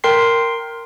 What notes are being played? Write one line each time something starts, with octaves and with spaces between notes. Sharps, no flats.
A#4 G5 C6 C7